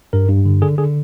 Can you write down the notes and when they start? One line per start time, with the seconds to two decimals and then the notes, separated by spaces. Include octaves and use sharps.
0.13 G2 A#4
0.29 G2
0.45 D3
0.62 D3 G#4
0.78 D3 G#4